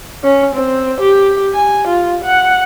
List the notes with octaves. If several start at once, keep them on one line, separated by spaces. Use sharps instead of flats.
C#4
C4
G4
G#5
F4
F#5